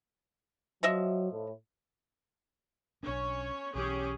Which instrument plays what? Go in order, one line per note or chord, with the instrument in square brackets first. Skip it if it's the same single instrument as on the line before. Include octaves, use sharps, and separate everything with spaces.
[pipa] F3 D#5 E5 [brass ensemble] F#3
[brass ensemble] A2
[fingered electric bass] B1 D4 [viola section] C#4 C#5
[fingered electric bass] B1 E3 [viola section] C#4 G4 G#4